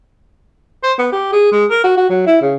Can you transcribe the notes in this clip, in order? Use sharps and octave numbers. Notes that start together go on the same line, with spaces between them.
C5
B3
G4
G#4
G#3
A#4
F#4
F#4
F#3
E4
C#3